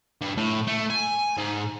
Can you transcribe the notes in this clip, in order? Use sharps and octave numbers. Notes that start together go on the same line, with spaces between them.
G2
A2
A3
G#5
G#2